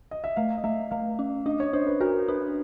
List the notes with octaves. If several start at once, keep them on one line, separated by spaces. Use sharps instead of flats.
D#5
E5
A3 F5
D#5
A3 E5
A3 F5
C#4
D4 D#5
C#5
D4 C5
B4
F#4 A#4
D4 B4